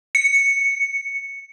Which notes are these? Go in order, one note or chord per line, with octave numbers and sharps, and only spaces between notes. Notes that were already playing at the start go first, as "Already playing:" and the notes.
C#7